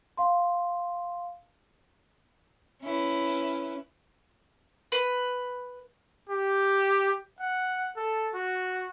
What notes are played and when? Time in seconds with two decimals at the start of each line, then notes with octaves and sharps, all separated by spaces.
0.17 F5 C6
2.83 C#4 E4 B4
4.92 B4
6.29 G4
7.40 F#5
7.96 A4
8.34 F#4